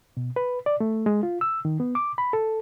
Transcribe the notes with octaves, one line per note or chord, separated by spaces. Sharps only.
B2
B4
D5
A3
G#3
F4
E6
D#3
B3
D6
B5
A4